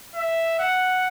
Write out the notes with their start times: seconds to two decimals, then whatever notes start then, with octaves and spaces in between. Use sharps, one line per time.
0.15 E5
0.59 F#5